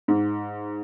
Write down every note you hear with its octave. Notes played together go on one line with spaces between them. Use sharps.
G#2